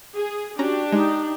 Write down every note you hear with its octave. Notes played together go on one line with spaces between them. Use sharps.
G#4
C#4 D4 F#4 G4 A#5
G#3 D#4